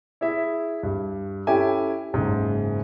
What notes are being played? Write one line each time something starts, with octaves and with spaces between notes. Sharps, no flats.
E4 G#4 E5
G2
C#4 E4 G4 A4 E5 G#5
F#1 G#2 C#3